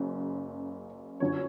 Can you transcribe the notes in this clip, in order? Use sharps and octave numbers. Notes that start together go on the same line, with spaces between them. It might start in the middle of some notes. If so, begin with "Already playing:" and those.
Already playing: F#1 F#2 C#3
G1 F#2 D3 C#5